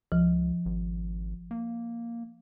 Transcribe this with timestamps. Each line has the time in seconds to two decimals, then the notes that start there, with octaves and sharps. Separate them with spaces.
0.12 C#2 F3
0.66 G#1
1.51 A#3